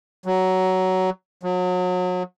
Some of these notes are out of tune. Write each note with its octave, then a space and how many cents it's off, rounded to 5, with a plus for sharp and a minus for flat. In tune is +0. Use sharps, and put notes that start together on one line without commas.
F#3 +15
F#3 -30